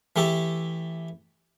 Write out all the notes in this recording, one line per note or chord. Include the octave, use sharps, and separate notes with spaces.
E3 A3 G4 A4